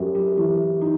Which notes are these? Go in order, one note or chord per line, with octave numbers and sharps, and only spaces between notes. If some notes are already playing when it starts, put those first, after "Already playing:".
Already playing: F#2 F#4 G4 A4
G4
E3
D#4